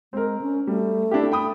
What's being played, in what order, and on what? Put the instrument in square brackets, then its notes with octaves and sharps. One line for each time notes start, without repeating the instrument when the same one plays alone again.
[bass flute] G#3 [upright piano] C4 A#4
[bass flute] C#4
[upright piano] G3 [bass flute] A3
[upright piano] D4 E4 G4
G5 B5 D#6